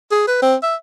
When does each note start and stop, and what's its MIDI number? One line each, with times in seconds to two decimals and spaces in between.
0.11 0.26 68
0.28 0.37 71
0.42 0.56 60
0.63 0.75 76